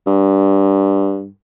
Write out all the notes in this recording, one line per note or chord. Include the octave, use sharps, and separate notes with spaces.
G2